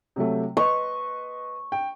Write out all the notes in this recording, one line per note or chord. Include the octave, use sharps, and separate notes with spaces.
C3 F#3 A3
B4 D#5 C#6
G5